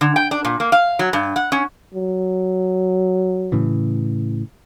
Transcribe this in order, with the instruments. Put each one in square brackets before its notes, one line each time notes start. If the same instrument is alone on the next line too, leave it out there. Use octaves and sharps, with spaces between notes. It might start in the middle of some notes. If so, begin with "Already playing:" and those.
[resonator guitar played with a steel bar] D3
G5
D4
A#2
A#3
F5
F#3
G2
F#5
C#4
[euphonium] F#3
[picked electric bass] A2 C#3 E3